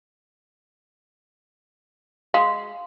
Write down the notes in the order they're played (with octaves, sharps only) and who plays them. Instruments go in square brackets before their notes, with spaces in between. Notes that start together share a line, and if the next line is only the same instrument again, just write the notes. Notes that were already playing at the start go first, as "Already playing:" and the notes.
[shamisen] G#3 [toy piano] F5